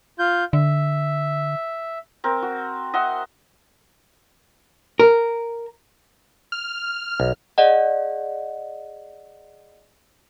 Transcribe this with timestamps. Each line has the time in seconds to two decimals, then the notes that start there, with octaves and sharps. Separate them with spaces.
0.19 F4 G6
0.53 D3 E5
2.24 C4 A#4
2.42 F#4
2.94 D#5 E5 F#5 C6
5.00 A#4
6.52 F6
7.20 B1
7.58 G#4 D5 D#5 F#5